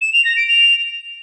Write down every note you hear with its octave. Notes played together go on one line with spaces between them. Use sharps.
E7
F7
A#6
D7
F7